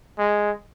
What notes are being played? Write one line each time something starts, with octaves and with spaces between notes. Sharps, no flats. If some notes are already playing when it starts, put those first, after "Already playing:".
G#3